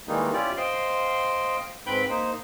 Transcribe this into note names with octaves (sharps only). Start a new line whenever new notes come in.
D#3 E3 G3 G#3 A#3 D#4
C#4 E4 F4 G4 D5
C5 D#5 F5 G5 C6
G#2 C4 B4 G5 B5 G6
A#3 D#4 C5